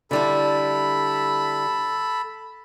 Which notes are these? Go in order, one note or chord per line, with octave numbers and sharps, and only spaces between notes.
D3 G3 E4 A4 B5